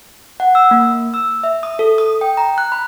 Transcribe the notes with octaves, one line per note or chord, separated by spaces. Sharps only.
F#5
E6
A#3
E6
E5
D#6
A4
D#6
G5
A#5
F#6
B5